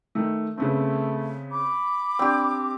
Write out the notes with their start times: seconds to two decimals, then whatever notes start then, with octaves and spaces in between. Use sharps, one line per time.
0.15 D#3 A3
0.58 C#3 A3 B3 C4
1.52 B5 D6
2.19 C4 D4 G4